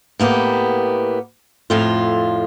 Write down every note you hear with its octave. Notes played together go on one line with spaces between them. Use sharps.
A2 A#3 B3 G4
F2 A2 F4